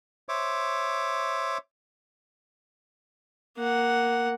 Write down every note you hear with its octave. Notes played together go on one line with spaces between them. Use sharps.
C5 C#5 E5 D6
A#3 F#5